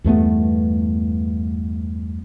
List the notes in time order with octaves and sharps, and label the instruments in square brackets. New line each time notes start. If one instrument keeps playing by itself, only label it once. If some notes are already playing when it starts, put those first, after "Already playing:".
[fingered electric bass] E2 G2 A3 B3